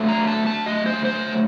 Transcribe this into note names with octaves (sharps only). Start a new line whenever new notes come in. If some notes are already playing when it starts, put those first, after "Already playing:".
Already playing: D3 F#3 A3
A#5
A5
A5
D#5
C5
C5